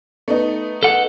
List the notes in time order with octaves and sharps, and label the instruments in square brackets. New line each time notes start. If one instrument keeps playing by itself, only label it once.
[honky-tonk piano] A3 B3 D#4
[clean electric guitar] A4 F#5